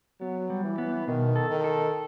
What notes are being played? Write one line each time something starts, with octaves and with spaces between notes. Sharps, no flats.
F#3 B3
G3
E3
B3
B2 D#3
A4
D#3
A4